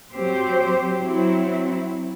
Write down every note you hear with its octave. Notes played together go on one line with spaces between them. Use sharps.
F#3 C4 G4 C5
F#3 C4 E4